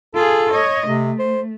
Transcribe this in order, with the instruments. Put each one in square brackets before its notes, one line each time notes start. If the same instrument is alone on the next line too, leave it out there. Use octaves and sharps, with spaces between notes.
[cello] F4 G#4 [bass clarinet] A4
[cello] C#5 D#5
[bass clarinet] C3 [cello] A3
[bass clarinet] C5